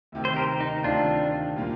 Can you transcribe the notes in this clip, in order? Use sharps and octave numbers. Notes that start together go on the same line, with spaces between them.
D2 C3 D#3
C5
G4 A#4
D#4
D2 C3 D#3 D4 F4
A#2 G3 A#3 F4